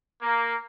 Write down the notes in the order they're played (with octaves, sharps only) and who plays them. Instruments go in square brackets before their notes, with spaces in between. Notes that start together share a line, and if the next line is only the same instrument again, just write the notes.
[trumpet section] A#3